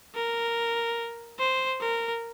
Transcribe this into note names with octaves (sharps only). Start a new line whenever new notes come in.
A#4
C5
A#4